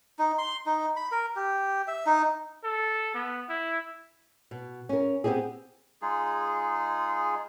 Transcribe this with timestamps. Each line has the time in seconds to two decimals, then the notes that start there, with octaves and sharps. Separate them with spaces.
0.19 D#4
0.38 C6
0.66 D#4
0.96 B5
1.12 A#4
1.36 G4
1.88 E5
2.06 D#4
2.64 A4
3.15 B3
3.49 E4
4.51 B2
4.89 C#4 A#4
5.24 B3 C4 D#4 G4 G#4
6.02 G#3 D#4 F4 G#4